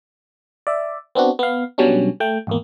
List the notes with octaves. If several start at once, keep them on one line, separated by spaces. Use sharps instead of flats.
D5 E5
B3 C4 D4 F#4
B3 F5
B2 F#3 G3 C#4 D4
A3 G5
G#1 E2 A#3